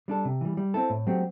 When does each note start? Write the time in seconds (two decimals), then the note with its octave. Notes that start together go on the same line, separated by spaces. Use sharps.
0.08 G3 D4 A4
0.25 C3
0.41 E3 G3
0.57 G3
0.74 C4 E4 A4
0.90 A2
1.07 F#3 A3 C4 G4